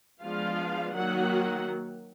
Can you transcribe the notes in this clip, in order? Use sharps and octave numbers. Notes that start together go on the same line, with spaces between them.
F3 G#3 B3 D4 F4 F5
D#3 F#3 A#3 F#4 F#5